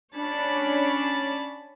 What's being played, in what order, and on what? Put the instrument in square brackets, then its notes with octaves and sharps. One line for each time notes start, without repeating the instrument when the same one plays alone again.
[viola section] C#4 D4 C#5 A5 B5